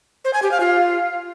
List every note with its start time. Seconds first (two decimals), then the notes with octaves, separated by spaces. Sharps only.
0.25 C5
0.34 G#5
0.42 G4
0.51 F5
0.60 F4